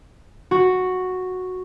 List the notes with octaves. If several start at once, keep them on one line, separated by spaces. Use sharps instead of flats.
F#4